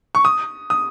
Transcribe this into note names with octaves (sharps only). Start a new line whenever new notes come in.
C#6
D#6
D#6